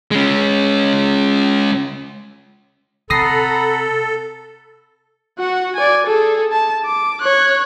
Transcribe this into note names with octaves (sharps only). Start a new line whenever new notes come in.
G#3 C#4
C3 A4 F#5 A#5 B5 D#6 A#6 C7
F#4 F#5
D5 G#5
G#4 A4
A5
D6
C#5 F#6